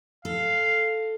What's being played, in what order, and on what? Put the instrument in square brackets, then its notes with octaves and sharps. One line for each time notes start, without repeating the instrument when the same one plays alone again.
[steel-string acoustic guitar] A4 [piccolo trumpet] F5